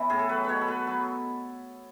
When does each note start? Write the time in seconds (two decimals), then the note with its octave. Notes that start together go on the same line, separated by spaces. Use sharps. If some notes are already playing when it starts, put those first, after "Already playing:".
Already playing: E3 B3 C#4
0.10 A2 G#4
0.19 A4
0.29 F#3 B4
0.44 B2 B4 C#5
0.61 A4
0.68 B2 B4
0.87 F#3 B4